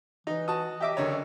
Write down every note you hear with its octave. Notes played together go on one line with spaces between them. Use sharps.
E3 D#4
F#4 A5 D#6
G4 D#5 E5 D6
F#1 D3 C#5